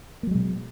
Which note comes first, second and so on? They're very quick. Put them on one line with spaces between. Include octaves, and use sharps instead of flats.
A#3 F#3 G#3 B2